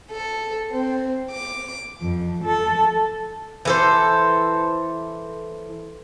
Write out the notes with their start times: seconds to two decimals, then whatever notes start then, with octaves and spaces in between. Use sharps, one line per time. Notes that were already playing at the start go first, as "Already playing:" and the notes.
0.11 A4
0.71 C4
1.31 D6
2.00 F2
2.44 A4
3.65 E3 A4 C5